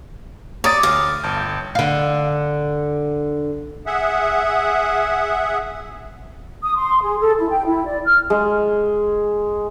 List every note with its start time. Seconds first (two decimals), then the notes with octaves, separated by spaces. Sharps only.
0.64 C#5 D5 A#5 D6 D#6 A6
0.83 D2 F5
1.24 G1 A5 G6
1.75 D3 F5
3.86 G#4 E5 F#5
6.62 D#6
6.77 C6
7.03 G#4
7.20 A4
7.39 E4
7.50 G5
7.66 E4
7.85 D5
8.04 F6
8.30 G#3